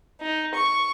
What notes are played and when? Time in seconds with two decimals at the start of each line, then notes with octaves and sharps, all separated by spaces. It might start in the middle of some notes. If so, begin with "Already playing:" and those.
0.21 D#4
0.55 C#6